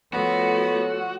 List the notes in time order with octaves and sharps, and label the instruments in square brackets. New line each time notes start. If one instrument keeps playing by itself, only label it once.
[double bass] F3 A3 [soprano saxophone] B3 [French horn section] F4 A4 C#5 [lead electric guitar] F#4